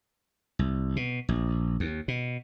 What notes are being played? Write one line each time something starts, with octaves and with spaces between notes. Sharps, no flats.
C2
B2
A#1
D#2
B2